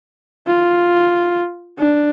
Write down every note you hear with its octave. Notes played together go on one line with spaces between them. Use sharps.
F4
D4